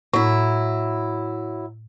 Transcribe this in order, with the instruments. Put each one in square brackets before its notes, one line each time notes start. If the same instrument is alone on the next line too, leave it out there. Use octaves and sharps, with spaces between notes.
[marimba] A2 [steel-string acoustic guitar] F#3 E4